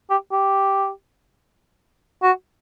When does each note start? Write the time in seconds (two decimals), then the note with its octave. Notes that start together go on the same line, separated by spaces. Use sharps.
0.10 G4
0.32 G4
2.23 F#4